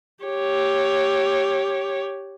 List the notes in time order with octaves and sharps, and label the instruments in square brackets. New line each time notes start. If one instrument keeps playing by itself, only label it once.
[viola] G4 C#5